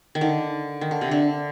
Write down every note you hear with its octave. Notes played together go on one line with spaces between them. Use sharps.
D#3
D3 D#4
D#3
D3
C3
D3 D4